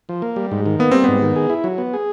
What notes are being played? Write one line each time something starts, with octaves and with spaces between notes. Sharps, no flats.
F3
A#3
G3
G#2
D#3
A#3 B3
G3 C4
G#2 B3
D#3
G#4
E4
F#3
B3
G#4